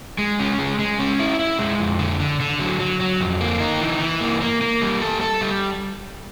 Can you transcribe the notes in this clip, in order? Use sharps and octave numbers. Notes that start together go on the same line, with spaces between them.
G#3
C#4
G#3
G#3
C#4
E4
E4
G#3
F2
D3
D3
D3
F#3
F#3
F#3
F2
A#3
D#4
E3
E3
A#3
A#3
A#3
G3
A4
A4
G3